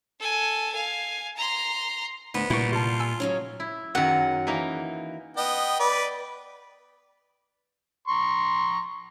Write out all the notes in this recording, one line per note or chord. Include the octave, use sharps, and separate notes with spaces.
A4 G#5
F5 G#5
A#5 C6
D2 B3
A#2 G3 E4 C#6
C3 F4 A5
G#5 E6
C#3 F#3 C#4
E4
F#2 D#3 F#5
E3 A#3 D#4
B3 D#5 G5
B4 D5
A#5 C6 C#6